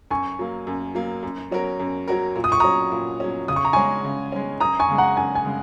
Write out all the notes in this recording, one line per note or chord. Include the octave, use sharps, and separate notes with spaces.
F#2 G#5 C#6
F#3 A#3
F#2
F#3 A#3
F#2
F#3 C#4 F#4 A#4
F#2
F#3 C#4 F#4 A#4
A#2
D#6
C#6
F#3 C#4 A#5 D#6
A#2
F#3 C#4
C#3 D#6
C#6
A#5
G#3 C#4 G#5 C#6
C#3
G#3 C#4
F#2 A#5 D#6
G#5 C#6
C#3 G#3
F#5 A#5
F#2 G#5
G#5
C#3 G#3